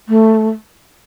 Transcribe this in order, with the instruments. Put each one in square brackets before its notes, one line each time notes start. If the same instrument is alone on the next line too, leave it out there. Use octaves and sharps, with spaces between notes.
[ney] A3